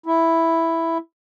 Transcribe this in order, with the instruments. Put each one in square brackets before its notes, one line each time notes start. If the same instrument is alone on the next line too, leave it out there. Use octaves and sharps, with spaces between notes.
[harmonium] E4